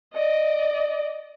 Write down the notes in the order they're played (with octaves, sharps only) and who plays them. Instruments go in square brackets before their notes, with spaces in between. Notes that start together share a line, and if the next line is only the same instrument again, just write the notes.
[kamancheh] D5 D#5